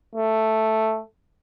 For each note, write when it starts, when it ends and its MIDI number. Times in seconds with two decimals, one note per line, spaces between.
0.16 1.01 57